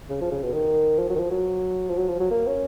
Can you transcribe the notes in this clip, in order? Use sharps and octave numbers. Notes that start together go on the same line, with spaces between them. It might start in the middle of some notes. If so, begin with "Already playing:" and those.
C#3
F3
C#3
B2
D#3
F3
F#3
D#3
F3
F#3
F3
F#3
F3
F#3
A#3
C#4